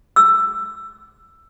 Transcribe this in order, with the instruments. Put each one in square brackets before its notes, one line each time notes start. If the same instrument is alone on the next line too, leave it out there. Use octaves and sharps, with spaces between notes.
[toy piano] E6